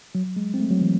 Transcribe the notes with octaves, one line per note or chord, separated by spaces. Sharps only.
F#3
G#3
C4
A3
F#3
E3